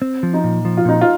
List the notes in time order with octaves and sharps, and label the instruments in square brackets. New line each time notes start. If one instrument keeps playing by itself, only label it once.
[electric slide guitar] C4
F3
[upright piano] D#4
[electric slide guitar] A#2
F3
[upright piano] F4
[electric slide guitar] A#2 [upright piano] D#4
[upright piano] F4